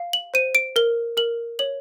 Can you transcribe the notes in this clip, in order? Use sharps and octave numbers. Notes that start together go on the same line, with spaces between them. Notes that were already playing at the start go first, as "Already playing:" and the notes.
Already playing: F5
F#7
C5 D#7
D7
A#4 G7
A#4 F#7
C#5 F#7